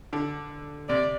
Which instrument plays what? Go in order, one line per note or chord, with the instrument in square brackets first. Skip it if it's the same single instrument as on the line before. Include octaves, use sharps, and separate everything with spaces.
[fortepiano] D3
[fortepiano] C3 [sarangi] D5